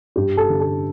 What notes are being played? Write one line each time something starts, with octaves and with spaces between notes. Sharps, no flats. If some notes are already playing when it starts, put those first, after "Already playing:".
G2 G4
A4
D3
A4